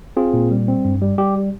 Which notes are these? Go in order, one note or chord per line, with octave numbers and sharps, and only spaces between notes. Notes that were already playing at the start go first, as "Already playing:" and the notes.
C4 F4 G#4
A#2
G3
C4
G2
G3
G3 G4